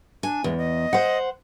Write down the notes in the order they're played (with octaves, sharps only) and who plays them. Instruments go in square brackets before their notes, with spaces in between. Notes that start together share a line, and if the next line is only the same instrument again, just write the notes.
[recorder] D4 [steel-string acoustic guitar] G#5
[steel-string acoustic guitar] E2 [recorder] G#3
[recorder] D#5
[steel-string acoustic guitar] C5 F#5